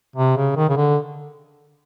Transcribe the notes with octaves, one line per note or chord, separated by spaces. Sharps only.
C3
C#3
D#3
C#3
D3